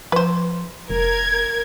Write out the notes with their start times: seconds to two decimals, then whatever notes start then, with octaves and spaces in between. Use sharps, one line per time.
0.12 F3 B4 C5
0.90 F1 A#4 G#6